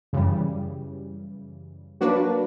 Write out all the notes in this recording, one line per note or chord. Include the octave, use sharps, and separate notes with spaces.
F#2 C#3 E3 G3
F#3 A#3 D4 F#4 B4